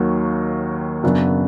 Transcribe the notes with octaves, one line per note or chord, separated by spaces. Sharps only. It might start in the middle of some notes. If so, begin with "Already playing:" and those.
Already playing: D#2 D#3 F#3 A#3
F#2 C#3 F#3 B3 D4